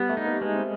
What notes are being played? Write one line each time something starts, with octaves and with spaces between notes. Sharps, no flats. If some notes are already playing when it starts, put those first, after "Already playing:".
Already playing: G3 B3
A3
D#4
A#3
G#3 B3
C4